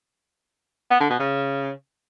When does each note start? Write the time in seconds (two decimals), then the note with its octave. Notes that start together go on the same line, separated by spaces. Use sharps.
0.90 B3
1.00 D3
1.10 B2
1.19 C#3